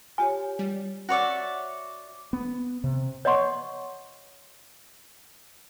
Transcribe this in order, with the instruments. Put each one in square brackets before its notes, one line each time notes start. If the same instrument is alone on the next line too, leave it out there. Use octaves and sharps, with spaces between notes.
[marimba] F4 G4 C#5 [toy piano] G#5
[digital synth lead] G3
[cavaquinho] F#4 C#5 D5 E5
[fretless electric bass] B3
C3
[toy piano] C#5 D#5 F#5 C6 C#6